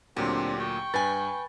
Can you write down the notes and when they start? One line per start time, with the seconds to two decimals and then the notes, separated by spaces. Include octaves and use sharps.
0.16 D2 A#2 F#3 C4 D4 G4
0.59 G5 C#6
0.94 G2 B4 G#5 B5 A6